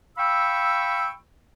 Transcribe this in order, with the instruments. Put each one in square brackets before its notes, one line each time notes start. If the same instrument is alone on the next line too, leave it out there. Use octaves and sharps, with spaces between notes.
[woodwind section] F5 G5 B5 C#6 E6